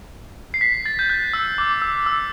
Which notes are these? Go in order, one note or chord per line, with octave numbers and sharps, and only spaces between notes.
C7
B6
A6
G6
F#6
E6
D6
E6
E6